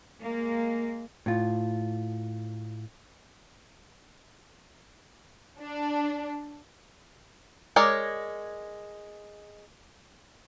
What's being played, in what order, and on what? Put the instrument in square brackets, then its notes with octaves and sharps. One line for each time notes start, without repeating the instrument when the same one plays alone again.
[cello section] G#3 A#3
[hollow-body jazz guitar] A2 F4
[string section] D4
[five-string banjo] G#3 A#4 C#5 D5